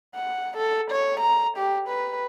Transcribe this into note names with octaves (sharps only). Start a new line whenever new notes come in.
F#5
A4
C#5
A#5
G4
B4